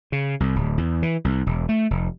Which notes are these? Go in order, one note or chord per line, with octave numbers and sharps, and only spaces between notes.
C#3
C2
D1
E2
E3
C2
E1
A3
F1